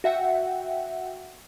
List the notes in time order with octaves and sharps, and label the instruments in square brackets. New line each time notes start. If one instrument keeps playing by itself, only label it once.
[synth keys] F#4 E5 F#5 G5